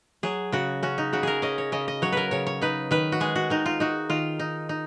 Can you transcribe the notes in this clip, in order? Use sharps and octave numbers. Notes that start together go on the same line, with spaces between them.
F#3 G#4
C#3 F#4
C#4 F#4
D#4
C#3 F#4
G#4 A#4
C#4 D#5
C#5
C#3 D#5
D#5
F#3 C#5
A#4 B4
C#3 C#5
C#5
D#4 B4
D#3 B4
F#4
G#3 G#4
F#4
D#3 D#4
F4
D#4 F#4
D#3 F4
D#4
D#4